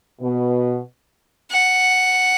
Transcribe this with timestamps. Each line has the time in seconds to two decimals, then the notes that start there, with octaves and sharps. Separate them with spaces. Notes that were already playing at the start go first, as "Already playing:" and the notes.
0.21 B2
1.51 F#5